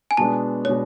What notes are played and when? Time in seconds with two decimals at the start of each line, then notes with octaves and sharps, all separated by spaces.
0.11 G#5
0.17 B2 G#3 B3 D4 A5
0.65 B2 G#3 B3 D4 C#5